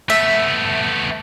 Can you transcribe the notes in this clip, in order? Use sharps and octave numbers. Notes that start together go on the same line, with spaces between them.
A3 B3 E5